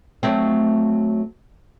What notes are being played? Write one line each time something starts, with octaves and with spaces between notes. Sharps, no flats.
F#3 A3 C4